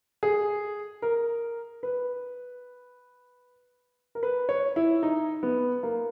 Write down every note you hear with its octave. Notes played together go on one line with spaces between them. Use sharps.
G#4
A#4
B4
A#4
B4
C#5
E4
D#4
B3
A#3